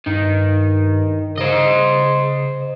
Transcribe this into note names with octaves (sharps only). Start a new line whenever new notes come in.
G2 D#3
C#3 C5 D#5